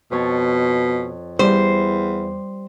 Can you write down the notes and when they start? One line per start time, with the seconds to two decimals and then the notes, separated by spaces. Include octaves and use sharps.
0.11 F2 B2 C#5 A5
1.39 E2 G3 C5